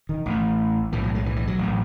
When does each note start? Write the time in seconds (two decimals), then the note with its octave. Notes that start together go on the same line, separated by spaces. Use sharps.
0.09 D#3
0.26 A1 A2
0.92 B1 A2 E3
1.04 F#3
1.15 G#3
1.26 E3
1.36 E3
1.47 F#3
1.58 A1 A2